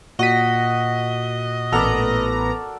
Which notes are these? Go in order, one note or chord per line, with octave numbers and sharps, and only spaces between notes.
A#2 F#4 D#5 B6
A1 B3 A4 A#4 D5 A#5